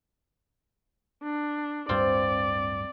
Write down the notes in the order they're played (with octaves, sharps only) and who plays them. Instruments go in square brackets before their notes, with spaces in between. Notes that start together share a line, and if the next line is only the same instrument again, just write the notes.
[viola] D4
[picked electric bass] D1 G2 [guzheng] C4 F4 [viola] D5